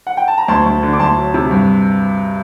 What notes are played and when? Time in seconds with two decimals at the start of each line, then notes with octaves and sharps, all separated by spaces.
0.07 F#5
0.17 G5
0.28 A5
0.38 A#5
0.48 D2 A5 C6
0.66 D2
0.83 D3
0.93 D6
0.99 D2 A5 C6
1.17 F#3
1.34 C3
1.51 G2